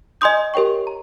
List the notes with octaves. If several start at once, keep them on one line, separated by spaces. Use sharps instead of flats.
D#5 G#5 C6 D#6 G6
G4 A#4 C#5 G5 C#6
A#5